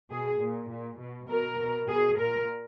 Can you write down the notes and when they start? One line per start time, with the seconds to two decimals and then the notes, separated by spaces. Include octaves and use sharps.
0.10 B2 G#4
0.41 A#2
0.70 A#2
1.00 B2
1.29 B2 A#4
1.59 B2
1.89 B2 G#4
2.19 A#2 A#4